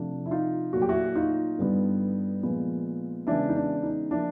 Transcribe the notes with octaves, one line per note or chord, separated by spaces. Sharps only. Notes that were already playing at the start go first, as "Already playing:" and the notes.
Already playing: C3 F3 A3 D4
E4
D#4 F4
A#2 F#3 A3 F#4
G4
E4 F#4
D#4 F4
G2 D3 G3 B3
A#2 F3 G#3 B3
C#3 E3 G#3 B3 D4 E4
D#4
D4
D#4
F3 A#3 D4 E4